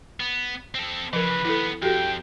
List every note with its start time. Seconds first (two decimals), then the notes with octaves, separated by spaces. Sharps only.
0.20 B3
0.75 C4 A4
1.13 C#3 E3 F3 A#4 B4
1.45 D#2 B3 E4 A4
1.82 F2 F#4 G4 A4 G5